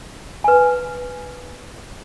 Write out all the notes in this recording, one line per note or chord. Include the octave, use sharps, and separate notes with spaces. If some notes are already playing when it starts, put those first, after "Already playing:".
B4 G#5